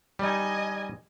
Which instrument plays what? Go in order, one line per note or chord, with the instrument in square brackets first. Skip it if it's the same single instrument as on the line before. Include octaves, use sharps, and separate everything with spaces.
[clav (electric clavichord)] G3 D#4 [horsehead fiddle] D#5 G#5